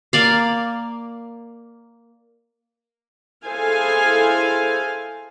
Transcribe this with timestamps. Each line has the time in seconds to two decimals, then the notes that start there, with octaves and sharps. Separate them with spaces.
0.13 A#3 D5 F5
3.46 E4 G#4 A4 C5 F5 G#5